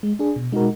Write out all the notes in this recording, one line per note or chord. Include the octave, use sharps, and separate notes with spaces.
G#3
D4 G#4
B2
G#3 D#4 F#4 A#4